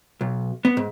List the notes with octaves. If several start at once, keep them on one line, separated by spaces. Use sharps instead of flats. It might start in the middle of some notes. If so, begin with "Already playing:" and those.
B1
B3
G#2